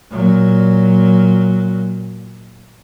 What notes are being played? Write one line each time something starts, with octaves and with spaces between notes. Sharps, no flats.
A#2 F#3